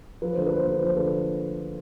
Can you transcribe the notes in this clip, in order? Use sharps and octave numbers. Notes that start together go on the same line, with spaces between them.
F3 B4
D3 C5
B4
A#3
C5
D3 B4
F3 C5
D3 A4 B4